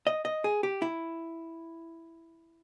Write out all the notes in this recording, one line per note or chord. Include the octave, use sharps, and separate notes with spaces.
D#5
D#5
G#4
G4
E4